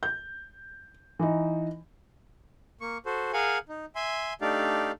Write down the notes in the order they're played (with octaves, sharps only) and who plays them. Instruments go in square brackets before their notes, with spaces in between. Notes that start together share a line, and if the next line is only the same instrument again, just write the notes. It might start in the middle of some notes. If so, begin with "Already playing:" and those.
[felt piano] G6
E3 D#4
[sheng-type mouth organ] A#3 C#6
F#4 A4 C5
G#4 A#4 F5 F#5 G#5
D#4
E5 G#5 C6
A3 D4 D#4 G4 D5 F5